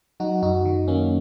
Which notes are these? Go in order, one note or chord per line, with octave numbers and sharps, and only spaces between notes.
F#3 D#4 F#4
F#2 D#4 F#4
D#3
F#2 A#3 C#4